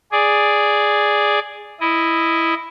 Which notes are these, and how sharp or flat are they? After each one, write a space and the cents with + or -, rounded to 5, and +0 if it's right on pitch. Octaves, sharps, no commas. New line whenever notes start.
G#4 +0 D5 +0
E4 +0 D#5 +0